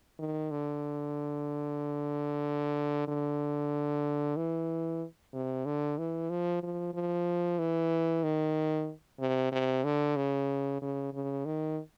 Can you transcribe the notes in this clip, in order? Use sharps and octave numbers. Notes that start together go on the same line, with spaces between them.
D#3
D3
D3
E3
C3
D3
E3
F3
F3
F3
E3
D#3
C3
C3
D3
C#3
C#3
C#3
D#3